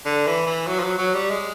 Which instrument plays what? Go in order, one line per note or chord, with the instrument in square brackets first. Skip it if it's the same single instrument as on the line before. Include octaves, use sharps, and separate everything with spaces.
[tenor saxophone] D3
E3
E3
F#3
F3
F#3
F#3
G3
G#3